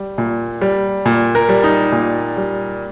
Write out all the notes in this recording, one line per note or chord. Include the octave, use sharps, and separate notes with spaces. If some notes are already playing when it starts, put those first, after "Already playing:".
Already playing: G3
A#2
G3
A#2
A#4
G3
D#4
A#2
G3